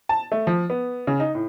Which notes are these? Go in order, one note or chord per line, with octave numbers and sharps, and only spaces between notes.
A5
A3
F3
B3
C#3
D#4
A2